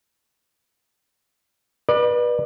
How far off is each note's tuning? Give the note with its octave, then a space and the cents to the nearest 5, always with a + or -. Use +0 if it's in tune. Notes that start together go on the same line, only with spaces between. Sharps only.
B4 -25 D5 +30